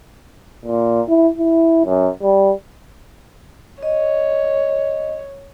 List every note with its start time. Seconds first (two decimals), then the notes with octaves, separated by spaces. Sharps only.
0.65 A#2
1.08 E4
1.38 E4
1.85 F#2
2.22 G3
3.83 C#5 D#5